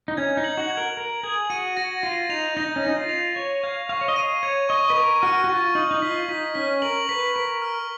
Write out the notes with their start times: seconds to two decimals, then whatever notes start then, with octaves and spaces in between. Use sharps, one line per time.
0.08 D#4
0.17 C#4 G#6
0.37 D#4
0.44 F#7
0.57 F#4
0.70 G#6
0.77 A#4
0.97 A#4 F#7
1.23 G#4 G#6
1.50 F#4 D#7
1.77 F#4 A#6
2.03 F4 A#6
2.29 D#4 F7
2.57 D#4 A#6
2.76 C#4
2.83 D#4 A#6
2.97 F4
3.09 F7
3.36 C#5 C#6
3.63 F5 G#6
3.89 F5 C#6
4.01 C#5
4.08 D#5
4.16 F5 D#7
4.43 C#5 G#6
4.69 D#5 C#6
4.90 B4
4.96 A#4 C#6
5.22 F#4 F6
5.44 F#4
5.49 F4 C#6
5.75 D#4 F#7
5.91 D#4
6.02 F4 B6
6.28 D#4 B6
6.55 C#4 B6
6.82 A#4 F#7
7.09 B4 B6
7.35 A#4 B6
7.62 F6